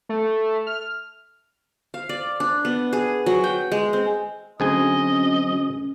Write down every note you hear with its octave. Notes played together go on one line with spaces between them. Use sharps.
A3
F6
F5
D5
D4
B3
G#4
F#3
G5
G#3
C4
D2 F#3 C4 C#4 G#4 D#5 G#5